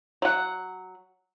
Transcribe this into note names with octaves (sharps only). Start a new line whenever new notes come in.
F#3 F#5